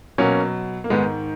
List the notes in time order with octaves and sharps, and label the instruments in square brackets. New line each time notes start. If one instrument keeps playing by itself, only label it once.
[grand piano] B2 F#3 A#3 C#4
A#3
G#2 D#3 G#3 B3